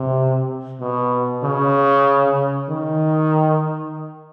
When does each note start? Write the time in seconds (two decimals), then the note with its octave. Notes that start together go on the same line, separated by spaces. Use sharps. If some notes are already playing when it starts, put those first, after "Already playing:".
Already playing: C3
0.80 B2
1.43 C#3
2.69 D#3